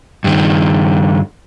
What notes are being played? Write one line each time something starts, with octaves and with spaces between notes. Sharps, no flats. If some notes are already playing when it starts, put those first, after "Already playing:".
G2 D#3